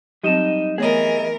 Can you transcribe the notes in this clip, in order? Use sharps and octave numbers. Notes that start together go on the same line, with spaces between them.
F#3 G3 C4 D#4 G4 D#5 E7
E3 A3 B3 G#4 A#4 C#5 D#5